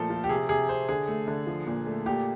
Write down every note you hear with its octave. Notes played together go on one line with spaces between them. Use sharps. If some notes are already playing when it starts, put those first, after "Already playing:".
Already playing: A#2 F3 A3 A4
F3
G4
C3 G#4
C3 G#4
C3 C5
D3 G#4
A3
D3
F3
A#2
A3
A#2 G4